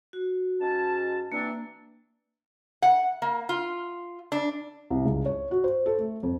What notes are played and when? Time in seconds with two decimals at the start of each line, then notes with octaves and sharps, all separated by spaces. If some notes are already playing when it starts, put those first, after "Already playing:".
0.13 F#4
0.60 G#2 C#4 A5
1.32 E3 A#3 C4 D4
2.82 F#5
3.22 A#3
3.49 F4
4.32 D4
4.90 C2
5.05 C#2
5.26 C#5
5.51 F#4
5.64 C5
5.86 A4
5.98 A3
6.23 F2